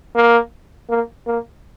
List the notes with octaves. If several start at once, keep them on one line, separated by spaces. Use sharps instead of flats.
A#3
A#3
A#3